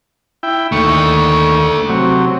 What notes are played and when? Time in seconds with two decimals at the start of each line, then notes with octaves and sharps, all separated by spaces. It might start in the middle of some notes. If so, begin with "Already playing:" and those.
0.43 E4 G5
0.72 D#2 A3 D4 C#6
1.89 C3 F#3